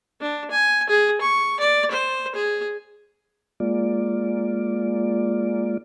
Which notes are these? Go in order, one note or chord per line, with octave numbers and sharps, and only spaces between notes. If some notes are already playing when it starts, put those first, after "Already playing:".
D4
G#5
G#4
C#6
D5
C5
G#4
G#3 A#3 F4 D5